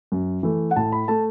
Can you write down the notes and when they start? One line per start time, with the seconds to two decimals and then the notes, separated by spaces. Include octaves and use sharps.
0.12 F#2
0.43 E3 A3
0.71 F#5
0.76 A2 A5
0.92 B5
1.08 A3 A5